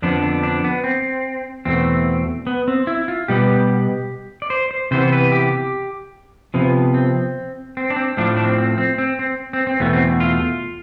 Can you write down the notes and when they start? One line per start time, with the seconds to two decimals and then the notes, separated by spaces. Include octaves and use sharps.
0.02 F2 D3 F3 B3 D4
0.22 D4
0.43 D4
0.64 B3
0.84 C4
1.65 E2 B2 A3 C4
2.47 B3
2.68 C4
2.87 E4
3.08 F4
3.28 B2 G3 B3 G4
4.42 D5
4.50 C5
4.71 C5
4.91 C3 E3 B3 C5
5.12 B4
5.32 G4
6.54 C3 F3 B3
6.94 C4
7.77 C4
7.90 D4
7.96 C4
8.17 A2 F3 A3 D4
8.37 D4
8.44 C4
8.58 C4
8.78 C4
8.98 C4
9.19 C4
9.53 C4
9.67 C4
9.80 E2 B2 A3 B3
9.93 C4
10.20 F4